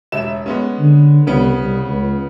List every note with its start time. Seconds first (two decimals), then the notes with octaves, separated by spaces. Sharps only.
0.12 E1 E5 E7
0.46 G#3 B3 C#4
0.79 D3
1.27 C2 C#3 B3
1.58 C2
1.88 C#2